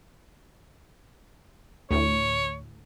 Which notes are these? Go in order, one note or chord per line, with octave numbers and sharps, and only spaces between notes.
D2 A2 C#5